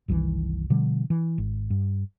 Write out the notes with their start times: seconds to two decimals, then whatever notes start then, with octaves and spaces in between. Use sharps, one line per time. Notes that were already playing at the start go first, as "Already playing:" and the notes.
0.08 F#1 C2 D#3 E3
0.70 B2 D3 F3 G3
1.10 E3
1.38 G#1
1.70 G2